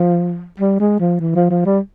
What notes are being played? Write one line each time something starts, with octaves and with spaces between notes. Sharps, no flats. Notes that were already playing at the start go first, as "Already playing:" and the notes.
Already playing: F3
G3
G#3
F3
E3
F3
F3
G3